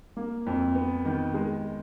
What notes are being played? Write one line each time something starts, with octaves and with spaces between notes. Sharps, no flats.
A#3
F2
B3
D#3
G#3